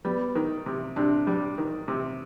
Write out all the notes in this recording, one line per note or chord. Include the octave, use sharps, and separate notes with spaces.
G3 B3
D#3
C3
C3 D4
G3
D#3
C3